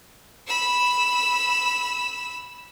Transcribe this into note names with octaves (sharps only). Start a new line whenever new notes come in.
B5 E6